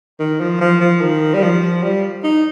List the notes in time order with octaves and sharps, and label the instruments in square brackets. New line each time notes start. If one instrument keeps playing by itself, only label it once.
[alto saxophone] D#3
F3
F3
F3
D#3
G3
F3
G3
D#4